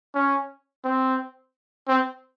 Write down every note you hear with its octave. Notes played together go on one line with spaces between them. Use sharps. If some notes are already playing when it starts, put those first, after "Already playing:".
C#4
C4
C4